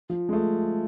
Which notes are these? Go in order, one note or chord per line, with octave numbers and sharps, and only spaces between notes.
F3
G#3
A3